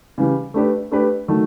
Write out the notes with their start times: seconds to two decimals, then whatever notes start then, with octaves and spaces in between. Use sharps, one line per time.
0.18 C#3 E3 G3
0.54 A3 D4 G4 B4
0.91 A3 D4 G4 B4
1.28 D#3 F#3 A3